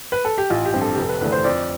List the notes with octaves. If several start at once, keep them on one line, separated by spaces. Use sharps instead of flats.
B4
A4
G4
A1 F4
G4
G2 F3 C4
A4
F1 G4
A4
B4
E2 D3 A3 D4 B4
C5
F2 D5